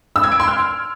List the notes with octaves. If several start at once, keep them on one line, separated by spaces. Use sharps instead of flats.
E6
G#6
D7
C6
F6